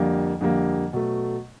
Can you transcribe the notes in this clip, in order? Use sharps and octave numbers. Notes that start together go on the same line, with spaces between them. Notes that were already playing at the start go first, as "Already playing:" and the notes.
Already playing: F2 D3 G3 A#3
F2 D3 G3 A#3
B2 F#3 A3